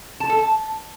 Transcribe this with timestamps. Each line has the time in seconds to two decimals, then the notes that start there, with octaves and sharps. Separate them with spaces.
0.20 A5
0.29 A4
0.39 A5